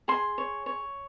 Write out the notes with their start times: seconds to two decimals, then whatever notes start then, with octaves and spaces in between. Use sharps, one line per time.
0.08 G#4 C6
0.38 C#5
0.66 C#5